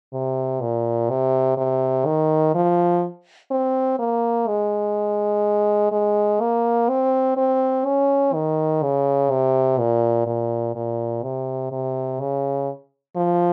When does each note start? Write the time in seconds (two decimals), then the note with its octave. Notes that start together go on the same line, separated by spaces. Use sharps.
0.13 C3
0.61 A#2
1.10 C3
1.57 C3
2.05 D#3
2.55 F3
3.51 C4
3.99 A#3
4.47 G#3
5.92 G#3
6.41 A#3
6.89 C4
7.37 C4
7.85 C#4
8.34 D#3
8.82 C#3
9.30 C3
9.79 A#2
10.26 A#2
10.75 A#2
11.23 C3
11.71 C3
12.20 C#3
13.16 F3